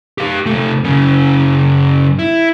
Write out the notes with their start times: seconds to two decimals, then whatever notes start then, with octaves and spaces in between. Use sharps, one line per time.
0.18 G4 F5
0.46 C3 A3
0.84 F#2 C#3
2.19 E4